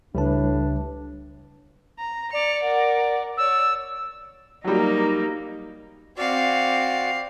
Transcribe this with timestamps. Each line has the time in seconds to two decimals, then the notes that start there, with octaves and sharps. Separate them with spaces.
0.15 C#2 A2 C#3 G3 D4 B4 A5
1.99 A#5
2.33 D5 C#7 F7
2.64 A#4 F#5
3.37 C#5 D5 E6
4.64 F#3 G3 A#3 D#4
6.18 C4 F#4 D5 F5